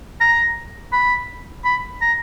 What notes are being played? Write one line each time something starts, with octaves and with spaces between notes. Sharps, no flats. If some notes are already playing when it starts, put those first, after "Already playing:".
A#5
B5
B5
A#5